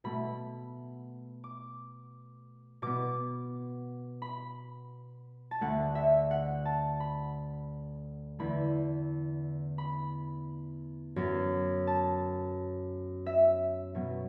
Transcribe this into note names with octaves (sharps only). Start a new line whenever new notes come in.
B2 A3 B5
D6
B2 B3 D6
B5
A5
D2 D3 A3 F#5
E5
F#5
A5
B5
E2 D3 A3 B5
B5
F#2 F#3 B3
A5
E5
B2 F#3 B3